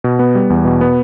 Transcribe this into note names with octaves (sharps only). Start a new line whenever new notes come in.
B2
B3
G3
E2
B2
B3